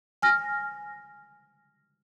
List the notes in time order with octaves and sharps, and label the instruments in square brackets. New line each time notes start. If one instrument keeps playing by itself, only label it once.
[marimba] G#5 F6 A#6